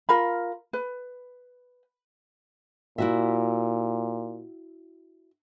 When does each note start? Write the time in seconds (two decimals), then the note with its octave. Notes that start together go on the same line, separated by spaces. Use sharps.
0.09 F4 A#4 B5
0.73 B4
2.98 A#2 E4 F#4 E5